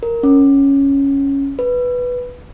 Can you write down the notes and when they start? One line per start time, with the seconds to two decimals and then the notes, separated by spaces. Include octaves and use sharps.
0.03 A#4
0.23 C#4
1.59 B4